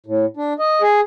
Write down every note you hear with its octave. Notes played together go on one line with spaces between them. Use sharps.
A2
D4
D#5
G#4